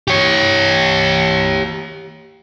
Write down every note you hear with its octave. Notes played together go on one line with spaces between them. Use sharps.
G4 C#5